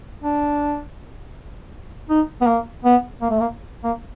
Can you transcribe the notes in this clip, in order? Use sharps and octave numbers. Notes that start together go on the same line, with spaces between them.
D4
D#4
B3
A#3
B3
A#3
A3
A#3
A#3